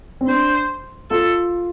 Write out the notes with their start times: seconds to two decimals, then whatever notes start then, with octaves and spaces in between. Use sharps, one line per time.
0.21 C4
0.27 D4 C5
1.10 F4 A4